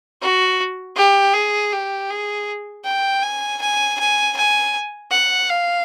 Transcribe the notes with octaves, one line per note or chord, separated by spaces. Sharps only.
F#4
G4
G#4
G4
G#4
G5
G#5
G#5
G#5
G#5
F#5
F5